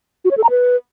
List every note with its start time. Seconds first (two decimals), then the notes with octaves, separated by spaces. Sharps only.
0.25 F#4
0.31 C#5
0.37 A4
0.44 A#5
0.50 B4